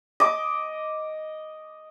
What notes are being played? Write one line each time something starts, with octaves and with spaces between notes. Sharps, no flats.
D#5 D6